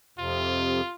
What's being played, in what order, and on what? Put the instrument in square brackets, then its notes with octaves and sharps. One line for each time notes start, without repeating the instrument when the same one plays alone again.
[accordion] F2 C3 [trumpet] F4